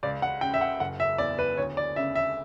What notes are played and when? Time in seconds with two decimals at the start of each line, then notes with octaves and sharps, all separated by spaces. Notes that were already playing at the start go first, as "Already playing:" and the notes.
0.03 C#2 D5
0.22 F#5
0.41 C#3 G5
0.54 E5
0.61 F#5
0.80 F#1 F#5
1.00 E5
1.18 E2 D5
1.39 B4
1.57 D2 C#5
1.77 D5
1.96 C#3 E5
2.15 E5